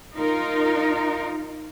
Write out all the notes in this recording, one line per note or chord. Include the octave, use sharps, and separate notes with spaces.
D#4 F4 A#4